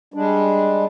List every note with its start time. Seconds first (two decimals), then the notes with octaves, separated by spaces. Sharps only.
0.14 G3 G#3 D4